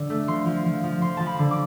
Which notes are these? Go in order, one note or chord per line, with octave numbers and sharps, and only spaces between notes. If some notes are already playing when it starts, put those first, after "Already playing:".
Already playing: D3
A3
F3 C6
F3
F3
F3
F3 C6
F3 A5
B5
D3
D6